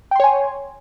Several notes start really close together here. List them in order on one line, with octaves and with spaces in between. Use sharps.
G5 C6 C#5 G#5